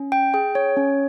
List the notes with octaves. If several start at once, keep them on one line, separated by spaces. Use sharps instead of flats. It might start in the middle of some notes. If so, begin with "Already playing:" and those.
Already playing: C#4
G5
G#4 G5
C#5
C#4